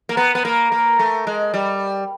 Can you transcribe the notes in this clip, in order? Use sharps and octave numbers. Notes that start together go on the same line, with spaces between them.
A#3
B3
B3
A#3
A#3
A3
G#3
G3